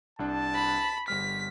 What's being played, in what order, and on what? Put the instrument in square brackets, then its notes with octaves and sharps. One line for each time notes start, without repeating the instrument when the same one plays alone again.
[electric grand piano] C2 D4 [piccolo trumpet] A5
[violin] B5
[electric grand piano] G1 G3 F6 [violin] B6